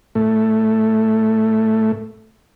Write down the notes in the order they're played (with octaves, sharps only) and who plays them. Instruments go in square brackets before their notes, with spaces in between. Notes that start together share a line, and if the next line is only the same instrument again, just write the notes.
[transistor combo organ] A2 A3